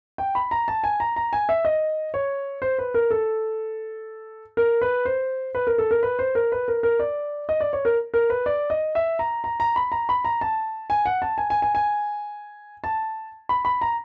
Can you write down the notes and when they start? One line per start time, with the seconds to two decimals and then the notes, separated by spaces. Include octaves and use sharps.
0.18 G5
0.35 B5
0.51 A#5
0.68 A5
0.84 G#5
1.00 A#5
1.16 A#5
1.33 G#5
1.49 E5
1.65 D#5
2.14 C#5
2.62 C5
2.79 B4
2.94 A#4
3.11 A4
4.57 A#4
4.82 B4
5.05 C5
5.55 B4
5.67 A#4
5.78 A4
5.91 A#4
6.03 B4
6.19 C5
6.35 A#4
6.52 B4
6.68 A#4
6.83 A#4
6.99 D5
7.49 D#5
7.61 D5
7.73 C#5
7.85 A#4
8.14 A#4
8.30 B4
8.46 D5
8.70 D#5
8.95 E5
9.19 A#5
9.44 A#5
9.60 A#5
9.76 B5
9.92 A#5
10.09 B5
10.25 A#5
10.41 A5
10.90 G#5
11.06 F#5
11.22 A5
11.38 G#5
11.50 G#5
11.62 G#5
11.75 G#5
12.84 A5
13.49 B5
13.65 B5
13.81 A#5